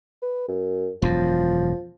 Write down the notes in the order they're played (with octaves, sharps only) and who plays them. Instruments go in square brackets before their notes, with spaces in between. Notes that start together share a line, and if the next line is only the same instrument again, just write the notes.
[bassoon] B4
F#2
[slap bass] E1 F#2 [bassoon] F3